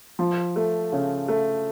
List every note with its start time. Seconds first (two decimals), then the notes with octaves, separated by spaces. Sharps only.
0.19 F3
0.56 A3
0.92 C#3
1.28 A3